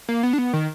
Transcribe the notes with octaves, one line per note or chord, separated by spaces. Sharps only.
A#3
B3
D4
B3
D#3